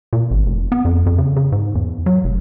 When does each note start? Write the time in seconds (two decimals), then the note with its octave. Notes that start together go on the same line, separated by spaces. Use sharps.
0.13 A#2
0.31 G#1
0.46 F1
0.72 B3
0.85 F2
1.06 F2
1.18 C#3
1.36 C#3
1.52 G#2
1.75 E2
2.06 F#3
2.24 F1